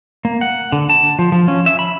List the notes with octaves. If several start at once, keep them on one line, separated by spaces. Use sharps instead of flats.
A#3
F#5
D3
A5
F3
F3
C#4
E5
B5